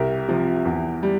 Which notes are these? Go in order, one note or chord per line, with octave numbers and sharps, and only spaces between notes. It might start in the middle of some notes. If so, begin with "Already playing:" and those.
Already playing: C2 G4 A#4
C3 F3
E2
G3